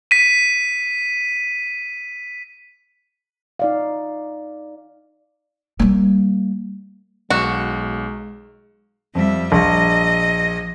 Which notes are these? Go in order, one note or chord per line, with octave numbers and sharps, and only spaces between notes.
B6 D#7
D#4 D5 F5
G3 A#3
B1 G#3 F#4 E7
F2 G3 E5
A#1 D#5